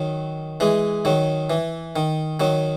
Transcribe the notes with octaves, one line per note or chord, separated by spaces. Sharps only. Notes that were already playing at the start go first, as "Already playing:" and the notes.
Already playing: D#3 F#3
E3 G#3
D#3 F#3
E3
D#3
D#3 F#3